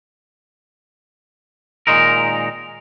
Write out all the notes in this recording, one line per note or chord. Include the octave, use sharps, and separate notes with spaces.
A#2 D#3 G#3 D#4 A#4